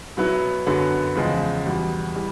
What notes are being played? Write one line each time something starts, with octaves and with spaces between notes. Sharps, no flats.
B2 F#3 B3 E4
F#2 D3 F#3 B3
E2 C#3 F3 G#3
E2 B2 G3
E3 G3